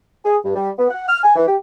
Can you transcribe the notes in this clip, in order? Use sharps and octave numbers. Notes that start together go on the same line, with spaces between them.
G#4
G2
G3
B3
F#5
F6
G#5
E3
G4